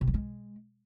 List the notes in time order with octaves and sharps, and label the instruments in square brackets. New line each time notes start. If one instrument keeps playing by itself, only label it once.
[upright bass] C3
G3
G#3